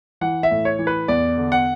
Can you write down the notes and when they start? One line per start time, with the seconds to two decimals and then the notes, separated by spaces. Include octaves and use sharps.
0.21 E3 F#5
0.43 E5
0.51 A2
0.65 C#5
0.79 E3
0.87 B4
1.08 E2 D5
1.37 D3
1.52 F#5